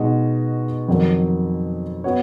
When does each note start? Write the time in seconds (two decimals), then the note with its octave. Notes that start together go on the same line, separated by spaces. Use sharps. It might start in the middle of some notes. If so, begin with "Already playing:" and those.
Already playing: B2 G#3 D#4 F#4
0.88 F2 D#3 F#3
2.04 B3 F#4 C#5